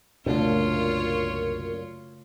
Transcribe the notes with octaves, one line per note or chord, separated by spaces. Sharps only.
C2 F#2 A#2 C#3 A3 D4 F4 C#5